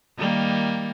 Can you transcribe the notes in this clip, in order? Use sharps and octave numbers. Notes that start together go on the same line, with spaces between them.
D#3 G3 A#3